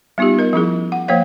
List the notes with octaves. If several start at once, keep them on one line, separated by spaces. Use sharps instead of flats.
G3 B3 D#4 F4 G4
A#4 D#5
F3 C#4 E4 G#4
F#5
F3 A#3 C5 C#5 F5